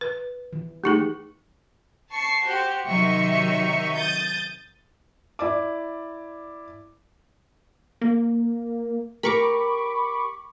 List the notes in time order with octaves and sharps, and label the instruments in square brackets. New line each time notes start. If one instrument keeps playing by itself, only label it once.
[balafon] B4
[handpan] E3
[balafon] A3 D#4 G#4 [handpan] G4
[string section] A5 C#6 C7
F#4 G4 C5
C3 D#3 F#3 D#4 E5 C#6
D#6 G6 A6
[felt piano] E4 D5 D6
[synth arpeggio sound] A#3
[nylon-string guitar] G4 A#4 [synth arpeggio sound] B5 C#6 D6